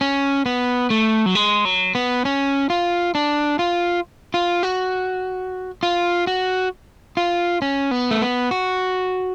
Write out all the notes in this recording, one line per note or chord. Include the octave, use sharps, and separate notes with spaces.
C#4
B3
A3
F#3
G#3
F#3
B3
C#4
F4
D4
F4
F4
F#4
F4
F#4
F4
C#4
B3
A3
B3
F#4